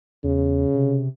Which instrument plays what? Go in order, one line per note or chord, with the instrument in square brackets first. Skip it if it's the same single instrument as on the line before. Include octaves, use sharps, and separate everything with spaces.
[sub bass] E2 [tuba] C#3
[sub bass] C3